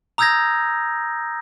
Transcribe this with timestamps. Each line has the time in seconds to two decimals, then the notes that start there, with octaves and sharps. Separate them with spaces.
0.18 A#5 D#6 E6 G6 G#6 A#6